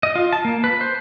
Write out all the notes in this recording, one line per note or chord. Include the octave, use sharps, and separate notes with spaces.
D#5
F4
A5
A#3
B4
C5